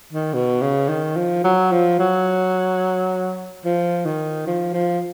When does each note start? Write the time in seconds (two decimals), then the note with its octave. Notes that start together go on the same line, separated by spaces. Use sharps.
0.13 D#3
0.34 B2
0.61 C#3
0.89 D#3
1.16 F3
1.44 F#3
1.72 F3
1.99 F#3
3.65 F3
4.05 D#3
4.47 F3
4.74 F3